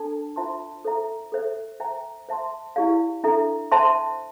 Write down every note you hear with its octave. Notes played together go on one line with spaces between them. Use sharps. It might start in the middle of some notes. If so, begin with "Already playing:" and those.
Already playing: D4 A4 A5
F4 C5 E5 A5 C6
A4 C5 E5 A#5
A4 C5 E5
C5 E5 G5 A#5
C5 E5 A5 C6
E4 G4 D5 F5
D4 A4 E5 A#5
C5 E5 A5 C6